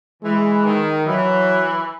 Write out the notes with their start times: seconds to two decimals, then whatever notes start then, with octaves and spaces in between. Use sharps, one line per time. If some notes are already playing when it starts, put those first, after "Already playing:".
0.23 E3 G#3
0.65 D#3
1.06 E3 F#3